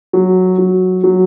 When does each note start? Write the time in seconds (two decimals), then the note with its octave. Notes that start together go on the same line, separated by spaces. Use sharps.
0.13 F#3
0.58 F#3
1.04 F#3